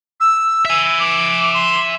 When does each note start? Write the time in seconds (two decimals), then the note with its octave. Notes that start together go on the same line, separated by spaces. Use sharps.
0.20 E6
0.65 E5 G#5
1.00 D6
1.54 C6